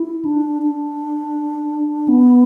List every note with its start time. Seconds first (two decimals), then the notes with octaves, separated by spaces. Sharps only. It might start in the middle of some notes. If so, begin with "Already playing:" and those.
Already playing: E4
0.25 D4
0.62 D4
2.08 B3